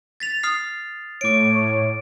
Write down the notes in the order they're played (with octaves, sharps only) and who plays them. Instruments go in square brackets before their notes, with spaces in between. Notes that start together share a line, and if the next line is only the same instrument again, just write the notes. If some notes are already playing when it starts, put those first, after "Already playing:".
[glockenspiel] A6 B6 F7
D#6 F6 C7
[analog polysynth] A2 C#5 [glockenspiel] D6 D7